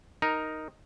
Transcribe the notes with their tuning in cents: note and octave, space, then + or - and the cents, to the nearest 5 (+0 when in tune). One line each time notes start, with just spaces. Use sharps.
D#4 +0 A#4 +0